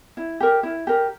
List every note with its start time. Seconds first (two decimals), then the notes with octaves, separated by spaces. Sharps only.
0.17 E4
0.40 G4 A#4
0.63 E4
0.87 G4 A#4